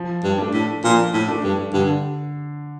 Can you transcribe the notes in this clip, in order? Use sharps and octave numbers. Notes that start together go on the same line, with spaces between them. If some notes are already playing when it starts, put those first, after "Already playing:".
Already playing: F3
G2
A3 D4
A2
A#2 F3
A2
A3 D4
G2
G2 D3